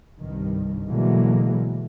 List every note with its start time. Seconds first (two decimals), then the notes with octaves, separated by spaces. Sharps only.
0.20 C2 G2 D#3
0.87 B2 D3 E3 F#3 G#3 A#3